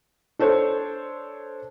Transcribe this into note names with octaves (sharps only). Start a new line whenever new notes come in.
D4 A4 C5 C#5